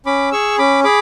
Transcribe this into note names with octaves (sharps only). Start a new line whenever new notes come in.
C#4 B5 D6
G#4 C#6 E6
C#4 B5 D6
G#4 B5 D6